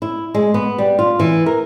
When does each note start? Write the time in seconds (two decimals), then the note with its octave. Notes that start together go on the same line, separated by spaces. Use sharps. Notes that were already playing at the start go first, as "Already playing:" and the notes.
0.02 E4
0.35 G#3
0.54 B3
0.78 G3
0.99 F4
1.19 E3
1.46 A#4